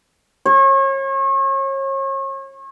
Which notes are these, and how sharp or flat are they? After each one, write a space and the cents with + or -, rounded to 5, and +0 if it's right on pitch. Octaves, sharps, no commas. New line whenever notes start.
C#5 -35